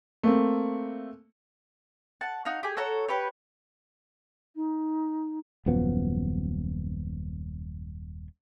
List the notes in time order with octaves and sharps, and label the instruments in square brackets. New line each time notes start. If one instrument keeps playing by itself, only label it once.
[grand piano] A3 A#3 C4
[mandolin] F#5 A5
D#4 F#4 F5
G4 G#4
F#4 A4 C#5 A#5
G4 B4 C#5
[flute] D#4
[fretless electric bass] D#1 F#2 F3 B3